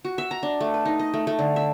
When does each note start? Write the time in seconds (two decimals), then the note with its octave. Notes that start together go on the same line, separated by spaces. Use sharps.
0.05 F#4
0.18 E5
0.31 A#5
0.43 D4
0.61 A3
0.74 B4
0.85 D#4
0.99 D#5
1.14 A3
1.27 A3
1.39 D3
1.56 E5